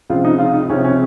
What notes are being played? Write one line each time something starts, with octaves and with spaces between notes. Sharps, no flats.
C#2 C3 F3 F4
D#4
F4
D#4
C#2 C3 F3 C#4
C#4